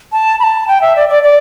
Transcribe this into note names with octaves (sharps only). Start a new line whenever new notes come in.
A5
B5
A5
G5
E5
D5
D5
D5